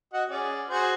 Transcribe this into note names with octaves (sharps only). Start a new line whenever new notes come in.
F#4 D#5 F#5
C#4 G#4 D5
F#4 G#4 C5